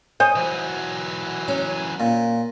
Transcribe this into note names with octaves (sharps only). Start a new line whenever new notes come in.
C5 C#5 D#5 G#5
E3 F#3
C#4
A#2